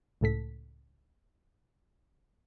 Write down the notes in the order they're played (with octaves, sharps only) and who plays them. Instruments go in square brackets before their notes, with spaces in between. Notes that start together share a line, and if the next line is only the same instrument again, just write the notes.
[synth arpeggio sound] C#2 A2 A4 B6